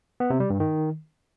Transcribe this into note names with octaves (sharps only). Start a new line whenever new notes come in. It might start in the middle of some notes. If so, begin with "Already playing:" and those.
B3
C3
G3
G2
D#3